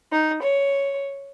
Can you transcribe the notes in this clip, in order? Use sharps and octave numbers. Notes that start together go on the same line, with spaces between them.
D#4
C#5